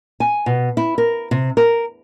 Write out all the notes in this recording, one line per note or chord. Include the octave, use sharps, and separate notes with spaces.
G#5
B2
E4
A#4
C3
A#4